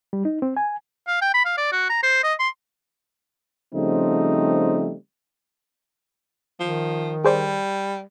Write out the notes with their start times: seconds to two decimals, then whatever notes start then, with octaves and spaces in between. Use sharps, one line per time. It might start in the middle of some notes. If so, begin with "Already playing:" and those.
0.13 G3
0.25 D#4
0.42 C4
0.57 G#5
1.08 F5
1.22 G5
1.34 B5
1.46 F5
1.57 D5
1.72 F#4
1.90 A#5
2.03 C5
2.23 D#5
2.39 C6
3.74 C#3 F3 G3 A3 C4 D#4
6.60 D#3 F3
7.25 G3 G#4 C5 D5